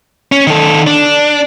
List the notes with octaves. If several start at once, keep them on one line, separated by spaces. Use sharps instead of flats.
C#4
D#3 A4
D4